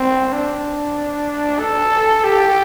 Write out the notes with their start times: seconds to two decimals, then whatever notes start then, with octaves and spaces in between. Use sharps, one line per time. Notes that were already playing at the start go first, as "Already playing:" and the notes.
Already playing: C4
0.32 D4
1.59 A4
2.24 G4